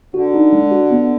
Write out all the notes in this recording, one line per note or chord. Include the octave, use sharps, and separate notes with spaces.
D3 F#4
D#4
G#3
F#4
B3